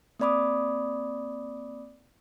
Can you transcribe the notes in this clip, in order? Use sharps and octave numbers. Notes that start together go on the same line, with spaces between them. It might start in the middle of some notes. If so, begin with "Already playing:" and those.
A#3 C4 D5 B5 D6 D#6